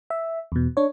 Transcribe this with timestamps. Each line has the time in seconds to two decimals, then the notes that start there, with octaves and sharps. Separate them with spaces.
0.10 E5
0.52 E2 B2
0.77 D4 C#5